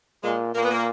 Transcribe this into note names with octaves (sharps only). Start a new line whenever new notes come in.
A#2 G#3
A#2 A#3
B3
A#3